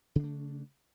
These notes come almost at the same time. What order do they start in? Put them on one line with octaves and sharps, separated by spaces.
C#3 D4 A3